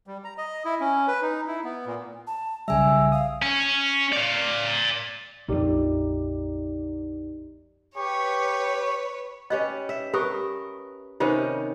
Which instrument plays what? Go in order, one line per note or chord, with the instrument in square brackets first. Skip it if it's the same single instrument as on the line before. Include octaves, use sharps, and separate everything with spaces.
[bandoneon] G3
A#5
D#5
E4
C#4
B4
D#4
E4
B3
A#2
[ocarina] A5
[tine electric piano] B1 C#3 G3 [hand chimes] E5 G#5 [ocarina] E6
[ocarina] F5 [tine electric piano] D#6
[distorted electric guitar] C#4
D5 F5
[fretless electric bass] A#1 F2 [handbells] D#4 G4 D5
[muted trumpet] G4 [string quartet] B4 C#5 [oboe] C#6
[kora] C#4 G4 B4 [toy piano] D#5
[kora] E5
[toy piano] G4 C#6 D#6 [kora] A#4 B4
[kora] C3 D#3 C#4 [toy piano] F4 C5